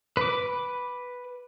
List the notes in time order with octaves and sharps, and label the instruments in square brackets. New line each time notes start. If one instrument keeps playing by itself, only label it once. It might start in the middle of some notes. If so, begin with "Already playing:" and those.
[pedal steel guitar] B4 D6